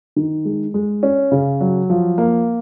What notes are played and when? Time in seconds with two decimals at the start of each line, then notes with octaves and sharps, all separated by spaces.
0.16 D#3
0.45 G#3
0.74 G#3
1.03 C#4
1.32 C#3
1.61 F#3
1.90 F3
2.18 A#3